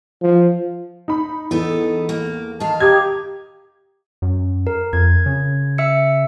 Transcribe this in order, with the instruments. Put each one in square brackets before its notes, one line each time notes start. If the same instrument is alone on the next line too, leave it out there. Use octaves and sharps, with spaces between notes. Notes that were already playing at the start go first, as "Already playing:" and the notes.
[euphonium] F3
[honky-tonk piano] D#4 B5
[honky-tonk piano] E2 [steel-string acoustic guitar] B3 D#4 A4
[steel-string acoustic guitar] A#3
[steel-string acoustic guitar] D#3 F5 [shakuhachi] A5
[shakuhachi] G4 [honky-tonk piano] A#5 D#6 G#6
[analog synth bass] F#2
[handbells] A#4
[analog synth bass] F2 [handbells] G#6
[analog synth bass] C#3
[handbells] E5 E6 C#7